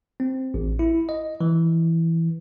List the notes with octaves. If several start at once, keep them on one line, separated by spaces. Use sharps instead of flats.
C4
A1
E4
D#5
E3